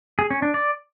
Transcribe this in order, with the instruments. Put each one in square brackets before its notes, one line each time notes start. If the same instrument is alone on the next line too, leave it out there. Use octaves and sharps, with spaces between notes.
[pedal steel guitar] G#4
C#4
D4
D5